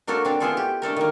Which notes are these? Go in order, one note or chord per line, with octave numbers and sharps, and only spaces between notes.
F#3 A#3 D4 F#4 A4
C4 D4 A#5
B3 D4 E4 F4 G#4 A4
G4
A3 D4 A4 A#4
D#3 A#3